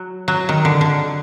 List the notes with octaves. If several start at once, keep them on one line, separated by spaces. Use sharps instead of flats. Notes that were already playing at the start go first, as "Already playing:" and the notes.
Already playing: F#3
F#3
D#3
D3
D3